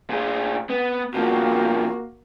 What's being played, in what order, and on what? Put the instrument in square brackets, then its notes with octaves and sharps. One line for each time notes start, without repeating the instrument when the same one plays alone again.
[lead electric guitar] A#2 G#4
B3
[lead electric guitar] B2 F3 [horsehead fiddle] A#3 F#4